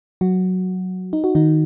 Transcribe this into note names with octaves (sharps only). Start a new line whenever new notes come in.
F#3 F#4
D#4
F#4
D#3 D#4